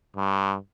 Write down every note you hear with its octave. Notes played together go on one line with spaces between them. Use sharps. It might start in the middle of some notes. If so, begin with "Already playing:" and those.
G2